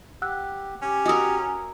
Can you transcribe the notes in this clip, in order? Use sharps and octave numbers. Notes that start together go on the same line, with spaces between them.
G4 F#5 E6 F#6
C#4 G4
F#4 A#4 D#5 D#6 E6